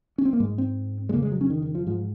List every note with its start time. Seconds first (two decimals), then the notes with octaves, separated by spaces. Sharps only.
0.18 C#4
0.25 C4
0.33 A#3
0.40 G#2 G#3
0.58 C4
1.09 G#3
1.14 C#3 A#3
1.16 F2
1.23 G#3
1.32 F#3
1.41 C#4
1.50 D#3
1.62 D#3
1.75 F3
1.86 G#2 F3